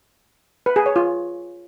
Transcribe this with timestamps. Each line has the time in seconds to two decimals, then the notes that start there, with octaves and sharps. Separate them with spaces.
0.66 B4
0.76 G#4
0.86 C#5
0.96 F4